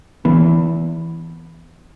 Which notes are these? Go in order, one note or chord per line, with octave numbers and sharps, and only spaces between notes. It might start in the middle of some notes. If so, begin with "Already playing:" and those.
E3 B3